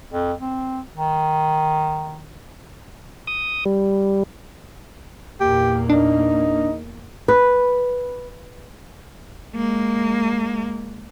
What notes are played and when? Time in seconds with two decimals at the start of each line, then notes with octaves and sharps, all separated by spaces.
0.13 F2
0.40 C4
0.95 D#3
3.27 D#6
3.65 G3
5.41 E2 A#2 A#3 G4
5.90 D4 D#4
7.28 B4
9.55 G#3 A#3